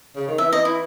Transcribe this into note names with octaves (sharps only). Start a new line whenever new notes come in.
C#3
D#3
E3 E5
D#5
E4